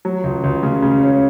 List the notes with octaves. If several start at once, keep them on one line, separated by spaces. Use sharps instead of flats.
F#3
C#2
C#2
C#3
C#3
C#4